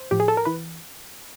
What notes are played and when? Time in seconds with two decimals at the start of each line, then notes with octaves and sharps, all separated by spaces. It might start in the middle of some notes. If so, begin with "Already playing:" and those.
Already playing: C5
0.11 A2 F3 G4
0.20 G#4
0.28 A4
0.37 A#4
0.45 E3 B4